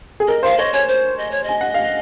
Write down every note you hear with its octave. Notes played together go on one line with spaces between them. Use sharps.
G#4
A#4 D#5
C5 F5
C#5 D#5
C#5 G#5
C5
D#5
C#5
D#5 G#5
F#5
F5